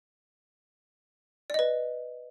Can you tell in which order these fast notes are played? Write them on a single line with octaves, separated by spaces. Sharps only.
D5 D#5 B4